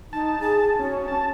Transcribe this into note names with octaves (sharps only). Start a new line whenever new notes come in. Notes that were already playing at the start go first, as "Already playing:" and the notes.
D#4 A5
G#4
C#4 F#4
A5